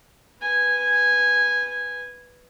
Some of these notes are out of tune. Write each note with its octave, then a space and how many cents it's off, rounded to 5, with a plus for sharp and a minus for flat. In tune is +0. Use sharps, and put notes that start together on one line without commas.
B4 +5 G#5 -10